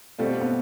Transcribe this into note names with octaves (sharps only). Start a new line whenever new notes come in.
B2 G3 A3 C4 F4 A4
B3